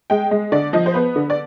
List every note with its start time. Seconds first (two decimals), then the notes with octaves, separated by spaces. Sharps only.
0.10 G#3 G5
0.31 G#3
0.52 D3 D5
0.73 F3 D#5
0.86 C5
0.94 B3 B4
1.16 D3
1.30 D5